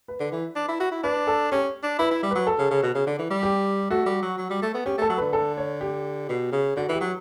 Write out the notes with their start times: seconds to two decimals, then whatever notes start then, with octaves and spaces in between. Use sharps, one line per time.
0.08 B4
0.20 D3
0.32 E3
0.56 D4
0.69 E4
0.80 F#4
0.91 E4
1.03 D4 B4
1.27 A4
1.52 C#4 G4
1.83 D4
1.99 E4 B4
2.11 E4
2.23 G3
2.31 F#3 B4
2.47 A4
2.59 C#3
2.71 C#3
2.83 B2
2.95 C#3
3.07 D3
3.19 E3
3.31 G3
3.43 G4
3.90 A3 F#4
4.06 G3
4.22 F#3
4.38 F#3
4.50 G3
4.62 A3
4.74 B3
4.86 C#4 G4
4.98 A3 A4
5.10 F#3
5.18 D3 B4
5.33 A4
5.57 C#5
5.81 G4
6.29 B2
6.52 C#3
6.76 D3 F#4
6.89 E3 G4
7.00 F#3